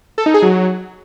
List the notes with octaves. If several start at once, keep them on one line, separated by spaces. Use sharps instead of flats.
A4
D#4
G#4
F#3